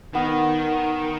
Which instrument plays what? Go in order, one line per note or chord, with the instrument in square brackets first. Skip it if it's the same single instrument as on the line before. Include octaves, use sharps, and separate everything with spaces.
[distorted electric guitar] D#3 [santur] B3